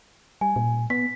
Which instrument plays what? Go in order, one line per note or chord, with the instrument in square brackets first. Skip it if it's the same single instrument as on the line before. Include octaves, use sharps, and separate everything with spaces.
[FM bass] G3 [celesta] G#5
[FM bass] A#2
[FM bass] B3 [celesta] B6